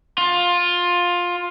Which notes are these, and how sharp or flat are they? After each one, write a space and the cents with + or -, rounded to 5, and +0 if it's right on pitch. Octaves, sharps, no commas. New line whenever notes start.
F4 +15